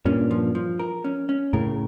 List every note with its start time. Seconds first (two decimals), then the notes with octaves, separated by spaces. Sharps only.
0.05 G2 A#2 C#4
0.31 F3
0.55 F3
0.79 A#4
1.04 C#4
1.29 C#4
1.53 A2 C#3 A#4